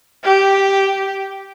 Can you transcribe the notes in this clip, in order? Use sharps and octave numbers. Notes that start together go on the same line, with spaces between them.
G4